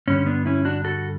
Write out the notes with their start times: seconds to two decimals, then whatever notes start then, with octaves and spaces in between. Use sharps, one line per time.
0.08 G2 D3 G3 C#4
0.26 B3 D4
0.46 C#4 E4
0.65 D4 F#4
0.84 F#4 A4